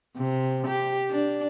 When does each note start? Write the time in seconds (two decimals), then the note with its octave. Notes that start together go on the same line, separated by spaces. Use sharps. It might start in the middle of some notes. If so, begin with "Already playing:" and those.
0.17 C3
0.68 G4
1.10 D4